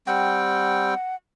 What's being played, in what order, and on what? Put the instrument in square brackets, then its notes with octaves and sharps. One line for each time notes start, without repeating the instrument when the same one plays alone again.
[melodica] G3 C4 G5 [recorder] F#5